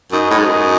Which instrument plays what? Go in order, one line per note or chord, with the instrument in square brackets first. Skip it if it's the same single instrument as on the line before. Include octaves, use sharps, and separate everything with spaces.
[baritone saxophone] F#2 [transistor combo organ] D#4
[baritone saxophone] A2
G#2
F#2